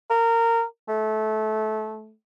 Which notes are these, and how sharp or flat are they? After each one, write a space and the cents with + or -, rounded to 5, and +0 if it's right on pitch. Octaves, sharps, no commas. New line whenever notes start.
A#4 -20
A3 -20